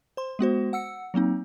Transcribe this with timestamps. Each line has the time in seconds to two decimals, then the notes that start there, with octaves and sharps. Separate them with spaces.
0.17 C5 C6
0.39 G#3 B3 F#4 C5
0.73 F#5 E6 C#7
1.14 F#3 A#3 C4 D#4